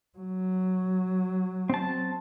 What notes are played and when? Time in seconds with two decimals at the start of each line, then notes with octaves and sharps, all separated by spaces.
0.18 F#3
1.70 C4 A5